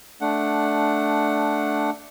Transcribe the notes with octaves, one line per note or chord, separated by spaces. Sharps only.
A3 D4 F#5